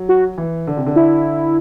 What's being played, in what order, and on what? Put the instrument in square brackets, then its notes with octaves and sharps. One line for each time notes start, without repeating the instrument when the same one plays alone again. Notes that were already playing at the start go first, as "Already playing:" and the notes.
Already playing: [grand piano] F#3
[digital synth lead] F#4
[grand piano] E3
D3
C3
D3
[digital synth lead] E4